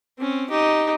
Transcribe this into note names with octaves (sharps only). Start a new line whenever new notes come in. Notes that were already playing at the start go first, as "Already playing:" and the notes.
C4 C#4
D#4 G4